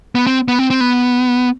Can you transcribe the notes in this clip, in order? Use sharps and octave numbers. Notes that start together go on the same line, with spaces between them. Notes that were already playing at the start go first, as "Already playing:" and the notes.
B3
C4
B3
C4
C4
B3